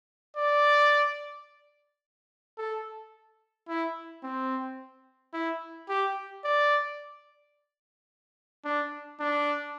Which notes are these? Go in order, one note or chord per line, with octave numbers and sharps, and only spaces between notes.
D5
A4
E4
C4
E4
G4
D5
D4
D4